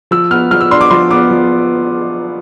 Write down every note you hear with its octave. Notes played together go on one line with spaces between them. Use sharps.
F3 E6
B3 F6
F3 F6
E6
D4 C6
D6
F3 C6
B3 D6
F3